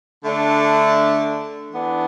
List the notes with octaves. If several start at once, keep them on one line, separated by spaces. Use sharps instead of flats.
D3 A3 D4
E3 B3 D4